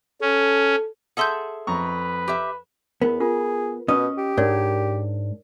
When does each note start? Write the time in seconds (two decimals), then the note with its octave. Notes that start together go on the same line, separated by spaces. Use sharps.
0.21 C#4 A4
1.17 G#4 A4 E5 F#5 C6 G6
1.67 F2 B4 A#5 C#6
2.28 G4 E5
3.02 E2 B3 A#4 B5
3.20 F4 G#4 A#4
3.88 B2 C#4 D#5 D#6
4.18 G4
4.37 G#2 D4 A#4 C#5 D5